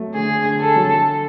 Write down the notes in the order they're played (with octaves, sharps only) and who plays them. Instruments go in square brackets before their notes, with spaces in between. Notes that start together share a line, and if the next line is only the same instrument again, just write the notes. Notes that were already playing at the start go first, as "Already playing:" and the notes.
Already playing: [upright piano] F#3 A3
[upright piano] D3 [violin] G#4
[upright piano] D3
[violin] A4
[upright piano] F#3